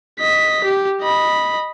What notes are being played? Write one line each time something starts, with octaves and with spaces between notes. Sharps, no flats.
D#5 B6
G4
D#5 B5